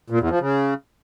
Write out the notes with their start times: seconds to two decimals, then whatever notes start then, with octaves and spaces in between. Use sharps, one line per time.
0.10 A#2
0.20 E2
0.30 F3
0.40 C#3